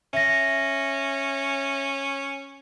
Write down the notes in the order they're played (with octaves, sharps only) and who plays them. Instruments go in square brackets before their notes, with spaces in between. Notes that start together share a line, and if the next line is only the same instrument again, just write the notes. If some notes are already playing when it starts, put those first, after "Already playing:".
[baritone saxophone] C#4 [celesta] E5 A#6